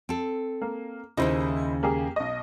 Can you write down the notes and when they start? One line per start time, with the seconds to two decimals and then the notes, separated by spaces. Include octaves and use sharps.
0.09 C4 A4
0.62 A#3
1.17 D#2 A#2 C#3 D#4 E4 C5
1.83 A#3 G4 G#4
2.16 B1 D#5